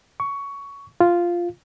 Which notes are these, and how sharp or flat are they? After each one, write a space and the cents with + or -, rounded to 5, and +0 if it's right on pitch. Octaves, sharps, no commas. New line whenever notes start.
C#6 +15
F4 -5